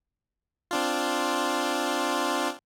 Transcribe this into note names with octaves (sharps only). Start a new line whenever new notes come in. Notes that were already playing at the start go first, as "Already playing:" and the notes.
C4 D4 F4